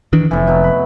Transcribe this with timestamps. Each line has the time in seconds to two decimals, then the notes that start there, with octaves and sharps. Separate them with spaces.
0.13 D#3 E3 D4
0.31 F1 F2 A2 E3
0.47 B2 F#3
0.64 B5